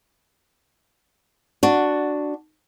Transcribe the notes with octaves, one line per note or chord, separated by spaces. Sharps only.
D4 F#4